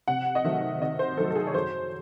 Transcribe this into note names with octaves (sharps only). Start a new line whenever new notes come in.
C3 F#5
D#5
D#3 F#3 A3 C4 E5
C3 D#5
C5
D#3 F#3 A3 C4 A4
A4
G#4
C#5
F#2 C5